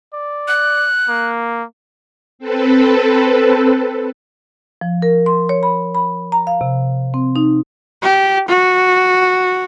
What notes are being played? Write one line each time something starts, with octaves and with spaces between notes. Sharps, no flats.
D5
F#6
A#3
C4 A4 B4
F3
A#4
C6
C#5
B5
B5
A#5
F5
C3
C4
D#4
G4
F#4